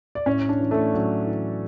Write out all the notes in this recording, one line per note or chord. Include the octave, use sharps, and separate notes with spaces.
D5
A2 C#4 C#5
D4 D5
E3
A3 A4
A2 F#3 F#4
E3